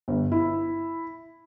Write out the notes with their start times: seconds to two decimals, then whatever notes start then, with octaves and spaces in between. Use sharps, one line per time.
0.08 G1
0.32 E4